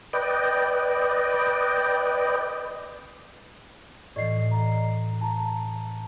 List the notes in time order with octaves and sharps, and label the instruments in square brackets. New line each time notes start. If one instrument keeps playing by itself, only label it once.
[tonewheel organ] B4 D5 D#5 G5
[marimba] A2 E3 [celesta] D5 D#5 C7
[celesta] A#5
A5 A#5